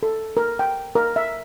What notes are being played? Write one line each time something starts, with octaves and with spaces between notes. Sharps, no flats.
A4
A#4
G5
A#4
E5